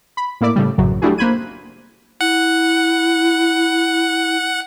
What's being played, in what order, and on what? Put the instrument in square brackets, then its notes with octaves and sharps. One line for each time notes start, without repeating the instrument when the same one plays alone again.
[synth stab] B5
A2 A#3 E4 D5 D6
A2 C#3 G3
A1 F#2 C#3 F#3
G3 A3 D4 E4 F#4 G#4
A#3 C5 B5 F#6 G#6 D#7
[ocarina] E4 [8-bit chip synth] F#5